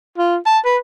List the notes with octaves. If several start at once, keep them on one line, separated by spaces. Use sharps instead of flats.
F4
A5
B4